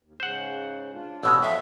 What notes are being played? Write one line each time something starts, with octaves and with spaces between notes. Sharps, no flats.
D#2
G#2 C#3 C5 F#5
D4 F4
A1 B2 G#3 E6
F2 A4 E5 F5